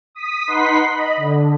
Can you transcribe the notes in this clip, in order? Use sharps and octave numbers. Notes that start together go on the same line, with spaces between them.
D#6 B6
D#4 B4 F#5 C6 B6
D#5 B5
D3